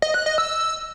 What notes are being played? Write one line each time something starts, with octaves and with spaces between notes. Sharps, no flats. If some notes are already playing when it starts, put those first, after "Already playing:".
D#5
F#6
D#5
E6